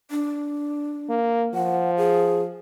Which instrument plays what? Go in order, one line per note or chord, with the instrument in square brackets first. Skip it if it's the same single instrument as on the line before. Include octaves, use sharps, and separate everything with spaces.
[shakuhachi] D4
[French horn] A#3
[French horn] F3 [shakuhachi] F#5
[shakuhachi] G#4